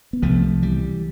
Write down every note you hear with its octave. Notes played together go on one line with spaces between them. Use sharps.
B3
C2 C3 F3 A3
E3 G3